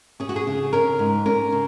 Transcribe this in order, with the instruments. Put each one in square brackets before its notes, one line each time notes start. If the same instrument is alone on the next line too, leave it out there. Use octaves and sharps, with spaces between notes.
[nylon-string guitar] C#4 G#4
F#4
G#4
C#3
C#4 A#4
G#2
C#4 A#4
C#3